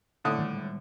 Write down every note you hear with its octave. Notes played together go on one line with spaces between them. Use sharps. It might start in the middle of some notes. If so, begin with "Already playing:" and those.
A2 D3 D#6
D#3 G3 G#3